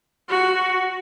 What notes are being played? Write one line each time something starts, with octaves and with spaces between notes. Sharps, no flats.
F#4